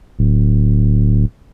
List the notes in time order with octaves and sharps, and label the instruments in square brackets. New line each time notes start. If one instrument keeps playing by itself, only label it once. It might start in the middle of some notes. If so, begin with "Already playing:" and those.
[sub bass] D1